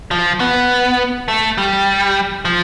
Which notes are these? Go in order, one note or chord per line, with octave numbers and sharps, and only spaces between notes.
F3
B3
A3
G3
F3